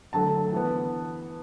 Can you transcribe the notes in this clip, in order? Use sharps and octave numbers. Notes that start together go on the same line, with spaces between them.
D3 F#3 A3 A5
E3 B3